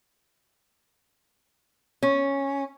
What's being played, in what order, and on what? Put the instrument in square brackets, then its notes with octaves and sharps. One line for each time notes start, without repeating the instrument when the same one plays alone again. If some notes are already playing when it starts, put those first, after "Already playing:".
[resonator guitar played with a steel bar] C#4